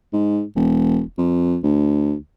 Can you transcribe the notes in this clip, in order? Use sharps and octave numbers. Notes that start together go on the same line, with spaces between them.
G#2
E1
F2
D2